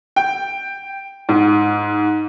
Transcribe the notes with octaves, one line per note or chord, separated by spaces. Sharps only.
G5
G#2